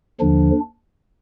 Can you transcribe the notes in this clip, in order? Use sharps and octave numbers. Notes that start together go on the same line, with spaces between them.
D#2 D3 F3 D4